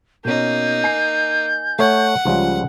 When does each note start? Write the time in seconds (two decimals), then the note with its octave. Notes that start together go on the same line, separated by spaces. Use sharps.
0.25 B2 A#3 C#4 D#4 G6
0.84 G#5 C7
1.79 A3 C#5 F#5
2.25 C#2 C#3 F3 G3